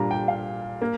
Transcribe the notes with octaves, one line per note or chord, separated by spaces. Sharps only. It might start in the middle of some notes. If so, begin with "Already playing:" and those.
Already playing: A#2 G3 D4 A#5
G5
F5
A#3